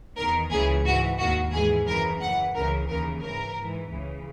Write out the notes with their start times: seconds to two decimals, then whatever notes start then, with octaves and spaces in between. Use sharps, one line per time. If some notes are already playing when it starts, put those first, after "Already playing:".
0.17 E2 D#3 A#4
0.51 C#2 C#3 E3 G#4
0.85 G#2 E3 F#4
1.19 D#2 D#3 F#4
1.53 G#2 E3 G#4
1.87 F#2 C#3 E3 A#4
2.21 F#2 E3 F#5
2.54 C#2 C#3 E3 A#4
2.88 D#2 C#3 E3 A#4
3.22 G#2 E3 A#4
3.56 G#2 E3
3.90 C#2 C#3 E3